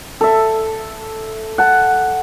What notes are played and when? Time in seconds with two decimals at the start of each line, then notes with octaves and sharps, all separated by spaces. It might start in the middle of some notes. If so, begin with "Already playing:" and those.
0.21 A4 E5
1.58 F#5 A5